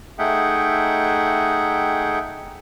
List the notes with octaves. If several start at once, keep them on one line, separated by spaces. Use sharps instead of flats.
A3 D#4 G#4 E5 F#5 G5